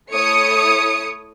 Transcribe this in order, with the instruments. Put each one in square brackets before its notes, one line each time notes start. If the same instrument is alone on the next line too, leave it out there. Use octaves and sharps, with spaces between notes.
[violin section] A3 E4 C#5 D#6 C#7